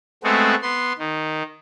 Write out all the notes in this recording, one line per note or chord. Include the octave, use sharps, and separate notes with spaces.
G#3 A3 B3 C4 F#4
B3 C6
D#3